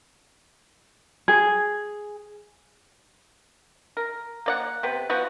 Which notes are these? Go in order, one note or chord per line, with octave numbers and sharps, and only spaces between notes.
G#4
A#4
A#3 D5 F#5
C3 B3 B4
F3 B3 F#4